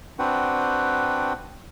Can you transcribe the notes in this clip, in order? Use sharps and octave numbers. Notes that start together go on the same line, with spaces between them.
C4 D4 F#4 B4 F#5 G5